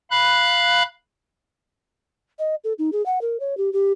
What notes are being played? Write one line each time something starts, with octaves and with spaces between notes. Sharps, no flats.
F5 B5 F#6
D#5
A4
D#4
G#4
F#5
A#4
C#5
G4
G4